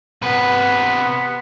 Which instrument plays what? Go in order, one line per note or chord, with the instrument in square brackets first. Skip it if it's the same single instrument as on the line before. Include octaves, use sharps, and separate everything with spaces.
[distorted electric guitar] C3 B4 [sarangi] B3